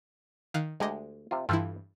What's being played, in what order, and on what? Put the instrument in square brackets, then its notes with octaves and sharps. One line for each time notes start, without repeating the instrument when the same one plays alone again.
[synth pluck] D#3 F5 F#6
[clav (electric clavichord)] D2 G4 G#5 [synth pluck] G#3 D#5
[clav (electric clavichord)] C3 F4
[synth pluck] G2 E3 E4 [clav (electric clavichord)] F4 A4 G5